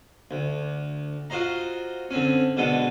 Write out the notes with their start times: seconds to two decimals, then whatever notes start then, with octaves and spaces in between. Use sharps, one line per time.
0.31 D2
1.30 F4 F#4 C5 D#5 A#5
2.11 D3 C4 C#4
2.57 B2 D3 G#3 B3 A4